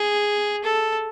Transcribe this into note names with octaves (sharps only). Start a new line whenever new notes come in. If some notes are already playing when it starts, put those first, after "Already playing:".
Already playing: G#4
A4